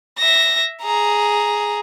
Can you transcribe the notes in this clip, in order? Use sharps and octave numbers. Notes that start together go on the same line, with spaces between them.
E5 A#6
G#4 A#5